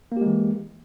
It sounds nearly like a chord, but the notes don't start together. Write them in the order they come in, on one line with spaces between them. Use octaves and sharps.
A#3 G4 G#3 E3